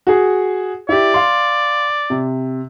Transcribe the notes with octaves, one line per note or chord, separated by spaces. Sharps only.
F#4 G#4
E4 G4 D5
F5 C6
C3